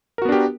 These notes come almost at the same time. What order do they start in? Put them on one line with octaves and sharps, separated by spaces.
A#4 F#4 B3 D4 G4